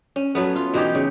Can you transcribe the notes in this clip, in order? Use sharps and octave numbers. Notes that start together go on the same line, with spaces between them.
C#4
F#3 A3 B3
F4
B2 E3 D#4 G4
C#3